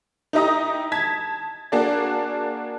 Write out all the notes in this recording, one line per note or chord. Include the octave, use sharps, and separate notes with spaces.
D#4 E4 G4 D#5 A#5 D#6
A5 G#6 B6
A#3 D4 F#4 G#4 D5